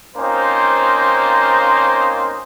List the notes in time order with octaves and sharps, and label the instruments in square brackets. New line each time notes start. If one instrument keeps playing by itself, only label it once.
[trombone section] A#3 C4 C#4 D#4 F4 C5